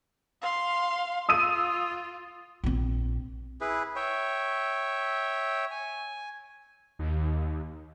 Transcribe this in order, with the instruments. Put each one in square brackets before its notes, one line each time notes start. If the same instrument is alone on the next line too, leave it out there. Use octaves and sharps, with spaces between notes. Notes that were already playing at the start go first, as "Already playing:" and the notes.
[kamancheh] F5 C6
[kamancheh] F4 [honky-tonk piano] D#6 E6 D#7
[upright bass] A#1 C4
[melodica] E4 G#4 B4
C#5 E5 G5
G#5
[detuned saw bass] D#2